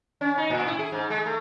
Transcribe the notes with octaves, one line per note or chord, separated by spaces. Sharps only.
C#4
D#4
A2
E4
G#4
G#2
G#3
A3